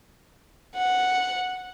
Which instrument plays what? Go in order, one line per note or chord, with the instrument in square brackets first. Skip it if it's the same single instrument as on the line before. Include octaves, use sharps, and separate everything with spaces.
[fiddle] F#5